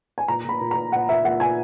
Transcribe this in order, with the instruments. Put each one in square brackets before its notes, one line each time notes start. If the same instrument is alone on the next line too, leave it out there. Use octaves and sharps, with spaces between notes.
[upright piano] G#5
A#2 A#5
A#2 B5
A#2
A#5
A#2
A#2 F#5
A#2 E5
A#2 F#5
A#2 G#5